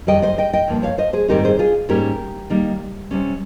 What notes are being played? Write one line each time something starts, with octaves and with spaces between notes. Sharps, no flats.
F2 D#3 G3 D#5 G5
C5 D#5
D#5 G5
D#5 G5
G2 F3 A#3
C#5 F5
C5 D#5
G#4 C5
G#2 D#3 G3 C4 D#4 G4 A#4
G#4 C5
F4 G#4
G#2 G3 A#3 C#4 G4 A#4
D#3 G3 A#3 D#4
C3 G3 C#4